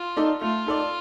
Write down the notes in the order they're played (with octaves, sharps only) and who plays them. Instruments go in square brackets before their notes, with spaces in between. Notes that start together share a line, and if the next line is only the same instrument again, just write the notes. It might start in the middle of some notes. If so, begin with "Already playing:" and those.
Already playing: [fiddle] F4
[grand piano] D#4 A4 D5
[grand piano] A3 [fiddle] F4
[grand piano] D#4 A4 D5